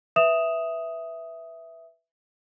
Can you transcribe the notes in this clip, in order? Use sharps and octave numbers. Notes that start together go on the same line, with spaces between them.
B4 E5 D#6 E7 F7